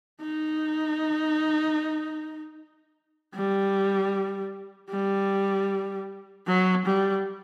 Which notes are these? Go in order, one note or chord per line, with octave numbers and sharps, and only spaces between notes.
D#4
G3
G3
F#3
G3